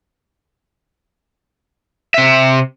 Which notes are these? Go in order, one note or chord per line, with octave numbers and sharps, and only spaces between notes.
C3 E5